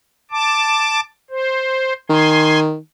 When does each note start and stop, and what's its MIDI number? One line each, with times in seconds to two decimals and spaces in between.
0.31 1.00 81
0.31 1.00 86
1.30 1.93 72
2.10 2.77 51
2.10 2.60 80
2.10 2.60 84